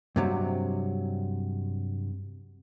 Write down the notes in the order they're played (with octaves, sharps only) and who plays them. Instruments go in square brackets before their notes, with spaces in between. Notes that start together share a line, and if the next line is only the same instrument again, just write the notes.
[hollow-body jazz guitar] G2 C3 F#3